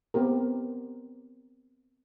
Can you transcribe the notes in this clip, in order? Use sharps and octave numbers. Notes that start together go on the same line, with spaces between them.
B3 C4 G4 A#4